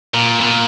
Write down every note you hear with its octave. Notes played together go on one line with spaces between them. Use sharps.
A#2
B2
A#2